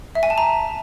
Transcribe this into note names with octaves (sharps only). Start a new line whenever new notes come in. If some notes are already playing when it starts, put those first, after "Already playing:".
E5
G#5
A5
A#5